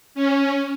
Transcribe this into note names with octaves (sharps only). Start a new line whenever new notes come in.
C#4